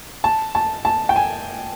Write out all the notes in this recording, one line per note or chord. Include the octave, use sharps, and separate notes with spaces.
A5
A5
A5
G5
G#5